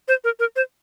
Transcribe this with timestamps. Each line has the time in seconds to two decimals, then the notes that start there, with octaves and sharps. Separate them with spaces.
0.08 C5
0.24 A#4
0.39 A#4
0.56 C5